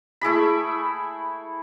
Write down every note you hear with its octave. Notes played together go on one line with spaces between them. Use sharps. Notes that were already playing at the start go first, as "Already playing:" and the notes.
A3 E4 G#4 B5